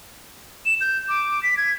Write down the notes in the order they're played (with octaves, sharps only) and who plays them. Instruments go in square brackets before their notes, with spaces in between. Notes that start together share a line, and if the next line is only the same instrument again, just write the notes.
[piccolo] E7
G6
D6
B6
G#6